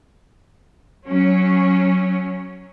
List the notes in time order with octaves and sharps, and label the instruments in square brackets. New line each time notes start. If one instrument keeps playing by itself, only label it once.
[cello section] F#3 C#4